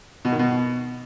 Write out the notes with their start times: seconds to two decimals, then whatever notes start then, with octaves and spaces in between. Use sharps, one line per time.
0.25 B2
0.32 D#3
0.39 B2